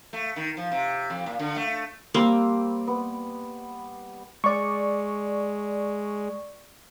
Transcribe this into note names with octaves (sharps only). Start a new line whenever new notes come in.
A3
D#3
F3
C3
F2
A#2
D3
A3
G3 A#3 C4
B3
G#3 D5 C#6